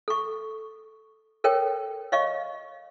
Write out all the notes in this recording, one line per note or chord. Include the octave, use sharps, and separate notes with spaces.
A4 C#6
A4 A#4 C#5 G5
C#5 D#5 F5 C#6